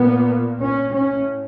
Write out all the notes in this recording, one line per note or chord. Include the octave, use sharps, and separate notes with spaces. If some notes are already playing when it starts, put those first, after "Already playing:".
Already playing: A#2 B3
C#4
A2 C#4